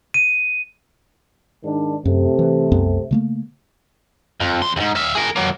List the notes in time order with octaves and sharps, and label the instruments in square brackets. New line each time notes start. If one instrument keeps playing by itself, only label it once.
[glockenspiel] D#7
[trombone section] G#2 D#3 D4
[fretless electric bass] F#2 [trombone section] C3 A3
[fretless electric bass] E3
C2 F#2 B3
C#3 A3 A#3
[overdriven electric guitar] F2
E2 C6
D#2 G#2
E5 F5
G#4 A#4
F#3 A#3